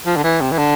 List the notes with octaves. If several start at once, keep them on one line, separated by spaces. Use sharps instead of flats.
F3
D3
E3
C3
E3
D3